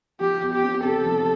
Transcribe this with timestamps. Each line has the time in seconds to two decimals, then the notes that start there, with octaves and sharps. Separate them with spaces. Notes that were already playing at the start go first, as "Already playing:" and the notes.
0.20 F3 G4
0.42 E2
0.53 G4
0.63 C4
0.84 C3 A4
1.05 F3